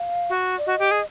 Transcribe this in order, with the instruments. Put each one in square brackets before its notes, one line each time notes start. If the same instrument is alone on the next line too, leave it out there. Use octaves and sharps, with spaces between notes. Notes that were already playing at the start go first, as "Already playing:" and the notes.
Already playing: [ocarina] F5
[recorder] F#4
[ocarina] D5
[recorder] F#4 [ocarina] D#5
[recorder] G4
G#4